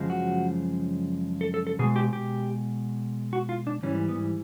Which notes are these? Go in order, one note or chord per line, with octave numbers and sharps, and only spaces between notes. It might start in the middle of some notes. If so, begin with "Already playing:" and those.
Already playing: F#2 C#3 F3 G#3
F#4
A4
A4
A4
B2 G#3 G#4
G4
G4
F#4
F4
D4
G#2 E3 G3 C#4
B3